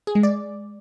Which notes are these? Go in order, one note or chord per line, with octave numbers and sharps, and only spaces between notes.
G#4
G#3
D5